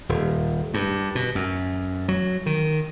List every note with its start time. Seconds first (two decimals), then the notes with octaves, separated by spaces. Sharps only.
0.09 D#1
0.74 G2
1.15 B2
1.35 F#2
2.08 F#3
2.46 D#3